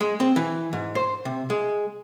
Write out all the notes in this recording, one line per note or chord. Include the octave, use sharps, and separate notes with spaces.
G#3
C4
E3
G#2
C5
C3
G#3